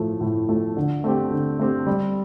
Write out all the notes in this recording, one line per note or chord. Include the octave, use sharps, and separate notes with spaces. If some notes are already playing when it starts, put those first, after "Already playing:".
Already playing: A2 F3 A3
A2
F3 A3
D3
A3 C4 G4
D3
A3 C4 G4
G3